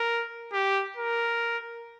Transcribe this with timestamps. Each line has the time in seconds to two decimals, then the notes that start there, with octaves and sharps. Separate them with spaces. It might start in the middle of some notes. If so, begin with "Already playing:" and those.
Already playing: A#4
0.53 G4
0.97 A#4